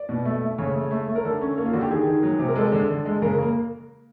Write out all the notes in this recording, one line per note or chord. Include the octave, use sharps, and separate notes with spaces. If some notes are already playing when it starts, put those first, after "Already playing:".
Already playing: D5
B2
A3
A3
C#3 C#5
A3
A3
A3
A#4
D3 A4
C#4
A#3
F4
D3 F#4
G4
D#3 G#4
D#3
F#3
C3
A#4
G#3 A4
D3
D3
G#3
C#3 A#4
A#3